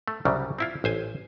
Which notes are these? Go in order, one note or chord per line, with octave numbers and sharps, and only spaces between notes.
A3
C2 C#3 F#3 G3
C4 E4 F4
A1 C5 G#5